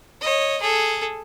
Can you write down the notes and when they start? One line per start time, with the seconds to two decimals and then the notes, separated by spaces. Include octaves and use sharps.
0.21 C#5 D#5
0.61 G#4 A4